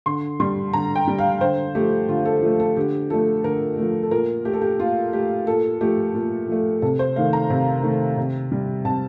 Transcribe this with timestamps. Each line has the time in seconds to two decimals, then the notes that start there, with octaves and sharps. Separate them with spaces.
0.06 D3 C6
0.40 G3 C6
0.73 D3 A#5
0.96 G5
1.08 G3
1.19 F5
1.41 D3 C5
1.75 F3 A3 G4
2.09 D3 F4
2.26 A4
2.42 F3 A3
2.60 A4
2.76 D3 G4
3.10 F3 A3 A4
3.44 D3 A#4
3.78 F3 A3
4.03 A4
4.11 A#2 A#4
4.45 A3 G4
4.53 A4
4.61 G4
4.79 A#2 F4
5.13 A3 G4
5.47 A#2 A4
5.81 F3 A3 G4
6.14 A#2
6.48 F3 A3
6.82 C3 A4
6.99 C5
7.16 D#3 A3 F5
7.33 A#5
7.50 C3
7.83 D#3 A3
8.18 C3
8.52 G3
8.85 C3 A5